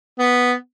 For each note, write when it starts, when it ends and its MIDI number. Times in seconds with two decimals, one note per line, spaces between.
0.19 0.53 59